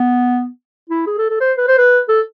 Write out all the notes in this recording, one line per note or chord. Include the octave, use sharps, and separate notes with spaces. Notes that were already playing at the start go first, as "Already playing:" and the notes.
Already playing: B3
E4
G#4
A4
A4
C5
B4
C5
B4
A4